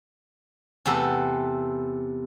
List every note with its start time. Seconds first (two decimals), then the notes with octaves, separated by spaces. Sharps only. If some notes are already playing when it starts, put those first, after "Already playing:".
0.86 E2 C3 A3 G4 A4 B4